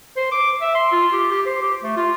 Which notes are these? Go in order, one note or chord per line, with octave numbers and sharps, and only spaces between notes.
C5
D6
E5
C6
F4
G4
G4
C5
G4
A3
F4